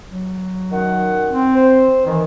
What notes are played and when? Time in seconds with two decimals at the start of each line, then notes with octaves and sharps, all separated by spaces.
0.10 F#3
0.71 F#2 D#3 F#5
1.29 C4
1.55 C5
2.06 D#3 E3